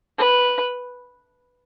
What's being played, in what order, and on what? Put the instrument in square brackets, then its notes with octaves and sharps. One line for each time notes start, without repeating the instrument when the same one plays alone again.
[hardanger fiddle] B4